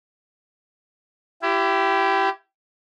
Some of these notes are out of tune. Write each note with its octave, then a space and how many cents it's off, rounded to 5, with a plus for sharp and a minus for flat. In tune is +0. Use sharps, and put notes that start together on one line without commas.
E4 +25 G4 -10